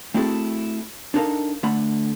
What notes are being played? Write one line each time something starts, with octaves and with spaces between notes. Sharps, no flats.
A3 C4 E4 F#4 G#4 A4
D4 D#4 A4 A#4 F5
D3 A3 F#5 B5